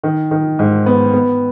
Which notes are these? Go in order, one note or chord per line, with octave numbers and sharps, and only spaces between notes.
D#3
D#3
G#2
B3
B3